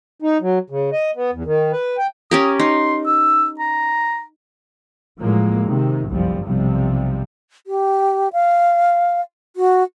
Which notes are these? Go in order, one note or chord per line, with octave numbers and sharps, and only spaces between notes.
D#4
F#3
C#3
D#5
B3
E2
D#3
B4
G5
C#4 G4 A#4 D#6
D#4 C6
E6
A#5
A2 F3 F#3 G#3 A#3
C3 D#3
G1 C2 F#2 F3 G3
B1 C3 F3 G3
G4
F5
F#4